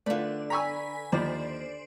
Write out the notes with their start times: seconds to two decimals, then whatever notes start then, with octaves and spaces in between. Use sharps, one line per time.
0.06 D3 A3 F4 B4 D5
0.50 G#5 A#5 B5 C#6 E6 B6
1.12 D#2 F3 C5 D5